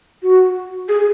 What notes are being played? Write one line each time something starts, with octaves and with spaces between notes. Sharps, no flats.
F#4
G#4